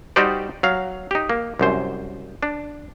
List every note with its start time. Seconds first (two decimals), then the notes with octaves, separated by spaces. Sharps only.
0.16 G3 D#4 F#4 G4 C5 D5
0.63 F#3 F5
1.11 D#4 G4
1.30 A#3
1.59 C2 F#2 C5
2.43 D4